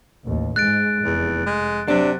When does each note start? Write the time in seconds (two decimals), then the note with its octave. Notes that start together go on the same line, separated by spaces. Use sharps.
0.25 A1 D#2
0.56 G#2 G#3 F#6 A6 D7
1.04 F1 E2
1.46 G#3
1.88 C3 F#3 D4